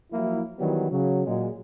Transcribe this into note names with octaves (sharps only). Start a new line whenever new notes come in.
F3 F#3 A#3 E4
D#3 E3 F#3 G3 B3
C#3 F#3
A#2 F#3 G#3